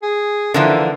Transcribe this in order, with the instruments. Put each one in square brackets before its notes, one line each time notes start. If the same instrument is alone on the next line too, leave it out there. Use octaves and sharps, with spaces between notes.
[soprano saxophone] G#4
[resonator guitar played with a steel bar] D3 E3 F3 [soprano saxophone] A#3